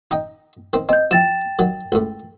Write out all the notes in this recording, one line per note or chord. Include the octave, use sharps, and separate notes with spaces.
D#4 D#5 G5
D#3 C4
C4 D#5 G6
F3 E4 G5 A6 E7
D#3 F#3
C#2 A2